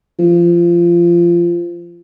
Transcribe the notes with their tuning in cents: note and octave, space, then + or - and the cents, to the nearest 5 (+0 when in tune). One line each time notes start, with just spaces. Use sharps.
F3 -20